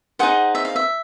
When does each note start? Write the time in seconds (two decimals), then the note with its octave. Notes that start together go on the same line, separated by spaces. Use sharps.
0.19 D#4 G#4 C5 F#5
0.55 E5
0.65 F5
0.76 E5